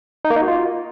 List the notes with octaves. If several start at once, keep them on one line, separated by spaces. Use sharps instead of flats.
D#4
A#3
D#4
F#4
F4